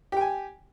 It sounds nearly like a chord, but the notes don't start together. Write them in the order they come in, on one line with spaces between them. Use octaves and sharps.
G4 G5 G#5